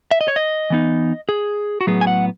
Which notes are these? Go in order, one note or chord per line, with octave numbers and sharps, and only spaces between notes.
E5
D#5
C#5
D#5
E3 B3 D#4
G#4
F#4
A2 F#3 B3 G#4
G#5
F#5